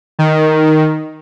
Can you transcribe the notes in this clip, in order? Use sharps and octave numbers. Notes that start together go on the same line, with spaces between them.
D#3